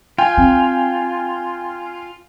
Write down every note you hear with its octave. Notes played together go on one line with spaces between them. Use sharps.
F4 G5 G#5
C4